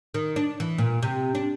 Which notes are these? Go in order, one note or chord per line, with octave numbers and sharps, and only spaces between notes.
D#3
D4
E3
A#2
C3
D4